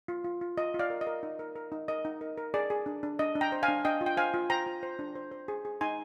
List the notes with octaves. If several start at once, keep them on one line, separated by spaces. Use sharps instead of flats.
F4
F4
F4
F4 D#5
F4
D5 F5
A#4
D#5
A#4
D#4
A#4
A#4
D#4
A#4 D#5
D#4
A#4
A#4
G#4 D5
G#4
D4
D4
D4 D#5
D4
G5 A#5
C5
F5 G#5
D4
D4 D#5 G5
F4
G5
C5 F5 G#5
F4
C5 G5 A#5
F4
C5
D4
C5
C5
G#4
G#4
D#4 G#5 C6